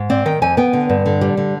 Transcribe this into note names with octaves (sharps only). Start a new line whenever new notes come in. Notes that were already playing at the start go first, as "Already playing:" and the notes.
Already playing: G#2
C4 D5
D#3 G5
F2 G#5
B3 G5
D3
G2
D3
G3
D3